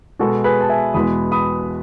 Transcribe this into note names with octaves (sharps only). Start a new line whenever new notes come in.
B2 G#3 B3 F#4 A4
G#4 B4
A5
E5 G#5
E2 B2 G#3 B3 B5 D#6
B5 D#6